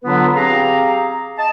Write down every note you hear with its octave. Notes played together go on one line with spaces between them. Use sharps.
D3 F#3 B3 D4 F4 B4
C4 G4 G#4 F5 A#5
D#5 A5